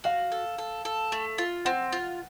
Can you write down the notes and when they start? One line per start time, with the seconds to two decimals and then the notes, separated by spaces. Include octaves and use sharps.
0.04 F#4 F5
0.32 A4
0.58 A4
0.85 A4
1.12 A3
1.38 F4
1.65 C4 F#5
1.92 F4